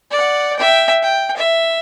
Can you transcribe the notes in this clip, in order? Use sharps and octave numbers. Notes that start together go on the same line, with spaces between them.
D5 F#5
E5 G5
G5
E5